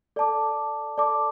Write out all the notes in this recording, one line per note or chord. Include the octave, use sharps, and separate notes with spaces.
A4 D5 A5 D6
A4 D5 A5 D6